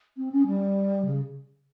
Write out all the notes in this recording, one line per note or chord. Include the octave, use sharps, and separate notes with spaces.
C4
C#4
G3
C#3